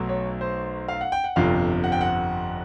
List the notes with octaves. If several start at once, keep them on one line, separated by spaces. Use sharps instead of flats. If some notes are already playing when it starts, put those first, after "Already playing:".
Already playing: B1 B2 F#3 A3
C#5
C5
F5
F#5
G5
F#5
G1 F2 C3 F3 F5
F#5
G5
F#5